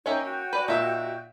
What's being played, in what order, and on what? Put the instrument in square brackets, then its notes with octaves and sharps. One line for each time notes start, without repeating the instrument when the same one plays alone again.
[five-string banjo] A#3 C#4 E5 [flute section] D#4 G5 [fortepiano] C#5
[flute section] F#4 G5
[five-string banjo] B4 D5
[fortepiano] A#2 E5 [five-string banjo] D#4 F#5